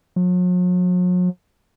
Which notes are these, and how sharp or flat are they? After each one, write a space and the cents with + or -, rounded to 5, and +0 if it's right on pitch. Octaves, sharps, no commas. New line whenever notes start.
F#3 -45